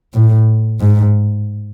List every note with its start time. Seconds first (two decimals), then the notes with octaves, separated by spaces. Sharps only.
0.14 A2
0.80 G#2